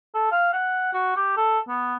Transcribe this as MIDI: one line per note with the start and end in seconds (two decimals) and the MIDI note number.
0.14 0.27 69
0.31 0.52 77
0.53 0.93 78
0.94 1.14 66
1.16 1.34 67
1.37 1.59 69
1.68 1.96 59